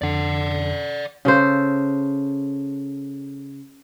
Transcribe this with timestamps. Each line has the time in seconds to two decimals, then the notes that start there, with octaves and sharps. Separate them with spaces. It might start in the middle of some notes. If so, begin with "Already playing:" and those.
0.02 F2 D3 D5 F#5
1.25 C#3 A4 C5